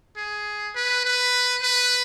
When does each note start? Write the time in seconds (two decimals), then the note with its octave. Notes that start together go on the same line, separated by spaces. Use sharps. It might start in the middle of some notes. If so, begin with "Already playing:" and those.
0.17 G#4
0.75 B4
1.04 B4
1.62 B4